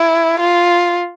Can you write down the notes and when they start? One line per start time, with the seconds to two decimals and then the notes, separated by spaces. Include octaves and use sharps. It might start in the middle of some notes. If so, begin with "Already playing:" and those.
Already playing: E4
0.40 F4